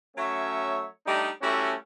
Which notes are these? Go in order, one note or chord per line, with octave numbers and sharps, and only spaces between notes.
F#3 A3 C#4 C#5 E5
G3 A3 D4 D#4
G3 A3 C#4 E4 F#4 A4